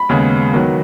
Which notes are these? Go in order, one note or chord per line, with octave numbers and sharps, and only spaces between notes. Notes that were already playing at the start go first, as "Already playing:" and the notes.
Already playing: B5
D#2 C#3 G#3 B3
E2 D#3 F#3 B3